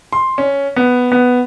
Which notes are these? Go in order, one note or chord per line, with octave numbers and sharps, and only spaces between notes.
C6
C#4
B3
B3